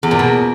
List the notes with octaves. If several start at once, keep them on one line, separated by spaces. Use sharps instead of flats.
E2
A#2
B2